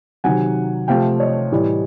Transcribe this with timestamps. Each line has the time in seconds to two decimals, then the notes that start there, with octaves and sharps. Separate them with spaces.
0.24 C3 D#3 F#3 F#5 G#5
0.88 C3 F3 A3 F5 G5
1.20 C#5 D#5
1.52 A2 E3 G3